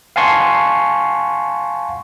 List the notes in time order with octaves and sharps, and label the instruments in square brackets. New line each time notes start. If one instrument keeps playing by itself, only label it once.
[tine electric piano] F5 F#5 G#5 A5 C6 C#6